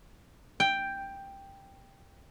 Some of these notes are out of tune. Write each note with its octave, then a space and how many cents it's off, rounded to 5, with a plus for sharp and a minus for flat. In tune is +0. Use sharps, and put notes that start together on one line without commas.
G5 +5